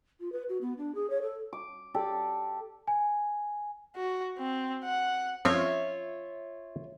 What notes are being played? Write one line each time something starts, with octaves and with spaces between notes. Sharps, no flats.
F4
B4
F#4
B3
D4
G#4
C#5
A4
D6
G4 A4 D5
G#5
F#4
C4
F#5
F3 C4 C#4 F4 C#5 E5